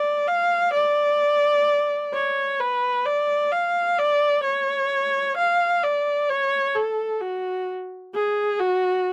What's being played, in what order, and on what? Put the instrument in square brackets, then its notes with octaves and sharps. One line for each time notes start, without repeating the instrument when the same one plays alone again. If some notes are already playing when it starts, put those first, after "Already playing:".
Already playing: [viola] D5
F5
D5
C#5
B4
D5
F5
D5
C#5
F5
D5
C#5
A4
F#4
G#4
F#4